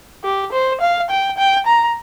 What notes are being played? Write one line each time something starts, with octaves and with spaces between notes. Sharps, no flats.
G4
C5
F5
G5
G5
A#5